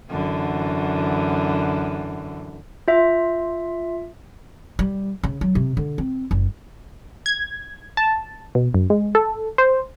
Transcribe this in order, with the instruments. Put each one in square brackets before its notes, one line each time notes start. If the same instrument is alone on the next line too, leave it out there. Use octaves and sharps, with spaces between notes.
[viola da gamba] F#2 D3 E3
[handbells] F4 E5
[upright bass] G3
C#3
F#3
C3
D3
C4
F#1
[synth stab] G#6
A5
B2
F#2
G#3
A4
C5